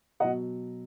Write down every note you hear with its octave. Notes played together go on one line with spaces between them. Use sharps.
B2 F#3 D#5 F#5